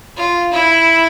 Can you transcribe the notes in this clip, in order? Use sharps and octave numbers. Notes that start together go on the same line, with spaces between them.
F4
E4